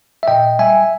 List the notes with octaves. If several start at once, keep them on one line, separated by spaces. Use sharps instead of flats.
E5
A#2 D#5 G5
G3 E5 G#5